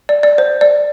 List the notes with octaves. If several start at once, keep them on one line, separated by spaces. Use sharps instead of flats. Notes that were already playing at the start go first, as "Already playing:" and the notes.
D5
D5
C5
D5